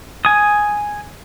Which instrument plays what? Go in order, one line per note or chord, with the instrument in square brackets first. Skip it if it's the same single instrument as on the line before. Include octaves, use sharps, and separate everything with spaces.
[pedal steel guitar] G#5 D#6